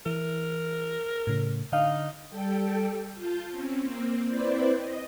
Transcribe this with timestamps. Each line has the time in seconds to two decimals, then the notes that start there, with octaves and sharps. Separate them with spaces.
0.06 E3 A#4
1.27 A2 C#3
1.72 D3 D#4 F5
2.30 G3 A4 G5
3.15 F4 A5 G6
3.50 C4 C#4
3.80 A#3 C4
4.26 C4 E4 B4 C5 D5
4.77 D#5